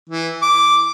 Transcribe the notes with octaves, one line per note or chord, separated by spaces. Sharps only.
E3
D6